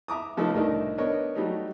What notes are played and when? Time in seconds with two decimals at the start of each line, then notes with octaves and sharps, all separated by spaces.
0.08 E5 A#5 D6 D#6
0.37 C#3 F3 A3 D#4 A4 B4
0.54 C2 A2 A3 D4 D#4 A#4
0.98 B3 D4 A#4 C#5 D#5
1.35 F#3 G3 A3 D#4